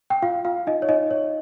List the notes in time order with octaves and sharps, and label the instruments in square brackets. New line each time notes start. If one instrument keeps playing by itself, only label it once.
[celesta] G5
F4 F5
F4 F5
D#4 D#5
C#5
D#4 D#5
C#5